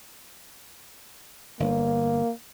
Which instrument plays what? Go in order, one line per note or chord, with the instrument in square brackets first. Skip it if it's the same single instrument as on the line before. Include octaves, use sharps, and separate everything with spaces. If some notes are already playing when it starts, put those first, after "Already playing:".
[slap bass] G1 [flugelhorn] A#3